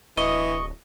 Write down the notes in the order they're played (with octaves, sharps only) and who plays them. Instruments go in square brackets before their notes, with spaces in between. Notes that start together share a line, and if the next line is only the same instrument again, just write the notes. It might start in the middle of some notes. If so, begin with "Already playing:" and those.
[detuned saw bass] D1 [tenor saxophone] E3 [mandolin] D#5 [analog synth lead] C#6